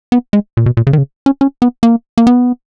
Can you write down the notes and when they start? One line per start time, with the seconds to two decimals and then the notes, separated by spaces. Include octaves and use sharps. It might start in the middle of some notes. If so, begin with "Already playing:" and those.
0.12 B3
0.33 G#3
0.57 A#2
0.66 B2
0.77 A#2
0.87 C#3
0.93 D#3
0.98 C#3
1.26 C#4
1.41 C#4
1.62 B3
1.83 A#3
2.18 A#3
2.27 B3